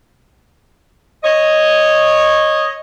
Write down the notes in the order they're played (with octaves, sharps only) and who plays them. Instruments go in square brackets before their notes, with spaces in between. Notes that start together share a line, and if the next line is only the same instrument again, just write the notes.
[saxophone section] C#5 D#5